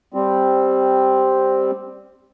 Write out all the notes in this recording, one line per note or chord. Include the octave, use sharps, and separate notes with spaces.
G3 C4